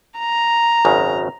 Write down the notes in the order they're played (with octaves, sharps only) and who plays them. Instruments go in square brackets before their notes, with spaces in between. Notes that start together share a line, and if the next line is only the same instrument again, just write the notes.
[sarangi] A#5
[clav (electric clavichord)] G#1 F#2 C#3